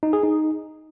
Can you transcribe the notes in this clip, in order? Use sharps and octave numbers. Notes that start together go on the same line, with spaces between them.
D#4
G#4
D#4